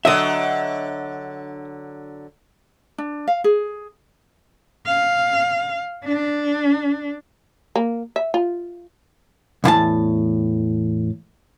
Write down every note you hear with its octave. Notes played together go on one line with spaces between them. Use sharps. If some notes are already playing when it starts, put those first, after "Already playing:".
D3 F#3 D#5 E5
D4
F5
G#4
F5
D4
A#3
E5
F4
B1 E2 A2 E3 A5